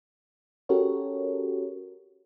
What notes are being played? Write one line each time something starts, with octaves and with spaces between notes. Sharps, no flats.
C#4 F#4 G4 A4 A#4 C#5